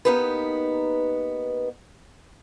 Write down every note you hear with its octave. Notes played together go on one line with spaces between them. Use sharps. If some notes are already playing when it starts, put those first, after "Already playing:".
A#3 B3 D#4 G4 B4